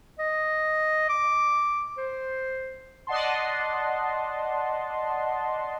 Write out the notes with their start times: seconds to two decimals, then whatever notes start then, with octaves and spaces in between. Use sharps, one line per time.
0.19 D#5
1.09 D6
1.98 C5
3.07 D5 D#5 F#5 A5 C6